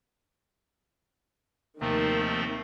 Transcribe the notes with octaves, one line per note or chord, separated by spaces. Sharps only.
D#2 C3 D#3 F3 A3 C4